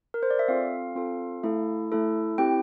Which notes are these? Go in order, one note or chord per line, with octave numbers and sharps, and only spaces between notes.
A#4
C5
D5
E5
C4 F4 A4 F5
C4 F4 A4
A3 E4 A4
A3 E4 A4
C4 E4 G4 G5